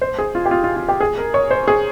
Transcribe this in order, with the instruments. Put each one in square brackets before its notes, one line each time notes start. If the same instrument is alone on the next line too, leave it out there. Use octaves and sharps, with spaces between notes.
[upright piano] C5
G#4
F4
G4
F4
F4
F4
G4
G#4
A#4
C#5
C5
G#4